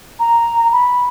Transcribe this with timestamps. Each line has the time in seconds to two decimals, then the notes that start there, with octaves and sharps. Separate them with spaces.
0.20 A#5
0.73 B5